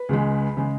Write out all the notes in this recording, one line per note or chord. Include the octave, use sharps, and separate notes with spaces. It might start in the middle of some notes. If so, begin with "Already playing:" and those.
Already playing: B4
C#2 C#3 G#3
C#3 G#3